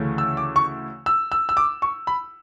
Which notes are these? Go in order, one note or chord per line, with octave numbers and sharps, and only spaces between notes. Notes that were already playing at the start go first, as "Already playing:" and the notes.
Already playing: D2 C#3 E3 A3 C#4
E6
D6
C#6
E6
E6
E6
D6
C#6
B5